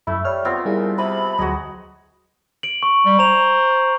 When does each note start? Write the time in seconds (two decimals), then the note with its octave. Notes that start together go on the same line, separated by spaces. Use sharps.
0.07 F#2 A3 E4
0.25 G3 C#5 F6
0.45 B3 C4 F4
0.66 A#2 G3 E4 G#4
0.98 C3 B5
1.38 D2 F#3 F#4 G#4 D#5 A#5
2.63 D7 F#7
2.83 C#6
3.06 G3
3.19 C5 A#5 F7